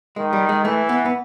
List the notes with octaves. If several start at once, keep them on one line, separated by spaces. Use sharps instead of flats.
D#3 G#3
G3
G#3
E3 A3
B3
B3